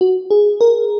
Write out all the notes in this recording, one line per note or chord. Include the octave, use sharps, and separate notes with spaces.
F#4
G#4
A#4